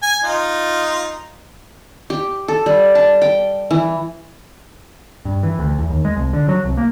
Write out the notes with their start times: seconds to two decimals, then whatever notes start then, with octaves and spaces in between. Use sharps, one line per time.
0.02 G#5
0.23 D#4 F4
2.10 G4
2.48 A4
2.66 G3
2.95 A5
3.22 G5
3.71 E3
5.25 G2
5.43 E3
5.59 D2
5.79 E2
5.90 D#2
6.05 G#3
6.17 C2
6.33 D3
6.48 F#3
6.64 C2
6.77 A#3